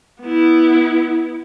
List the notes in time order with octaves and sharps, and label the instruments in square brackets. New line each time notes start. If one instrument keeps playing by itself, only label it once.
[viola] B3 E4